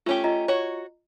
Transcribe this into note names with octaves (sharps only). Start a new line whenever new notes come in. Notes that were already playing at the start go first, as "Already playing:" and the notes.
A3 C#4 F4 G4
F4 D#5 A#5
F#4 C#5